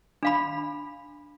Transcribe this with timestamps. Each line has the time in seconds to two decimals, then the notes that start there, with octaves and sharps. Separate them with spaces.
0.23 D4 F5 B5